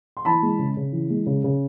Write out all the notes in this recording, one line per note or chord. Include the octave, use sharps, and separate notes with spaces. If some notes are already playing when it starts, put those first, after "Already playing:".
C6
E3 A5 B5
G#3
C#3
C#3
E3
G#3
C#3
C#3